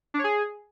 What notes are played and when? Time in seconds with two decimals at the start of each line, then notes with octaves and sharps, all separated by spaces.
0.14 D4
0.19 C#5
0.24 G#4